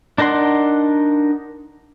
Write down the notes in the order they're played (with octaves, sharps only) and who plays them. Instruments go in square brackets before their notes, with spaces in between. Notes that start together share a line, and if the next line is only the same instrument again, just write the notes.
[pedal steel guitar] D4 D#4 A#4 F#5 C6